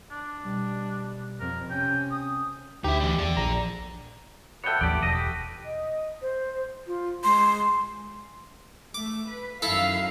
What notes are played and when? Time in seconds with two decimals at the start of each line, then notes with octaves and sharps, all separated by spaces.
0.11 D4
0.43 B2 G3
1.40 F2 A#4
1.70 C3 C#4 G5
2.11 D#6
2.84 D2 D#4 G4 E5
3.00 E3 G3
3.18 E2 A4 D5
3.37 A#1 A#5
4.64 A3 B3 C#5 G5
4.81 A1 D#2 F3 G4 D5
5.03 E1 D#5 A5
5.15 G4
5.64 D#5
6.21 C5
6.86 F4
7.24 G#3 C6
8.94 A3 D6
9.29 B4
9.62 F#2 D#3 E4 A4 F5